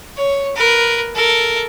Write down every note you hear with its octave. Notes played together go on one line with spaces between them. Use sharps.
C#5
A#4 B4
A4 A#4